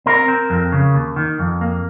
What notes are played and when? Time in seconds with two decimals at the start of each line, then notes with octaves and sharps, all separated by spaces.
0.06 C4 A#4
0.28 C4
0.50 F2
0.72 C#3
0.94 D#2
1.16 D#3
1.39 F2
1.61 A#3